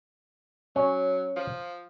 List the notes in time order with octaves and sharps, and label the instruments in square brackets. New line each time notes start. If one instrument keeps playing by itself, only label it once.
[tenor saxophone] F#3 [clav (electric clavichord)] C#4
[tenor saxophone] F3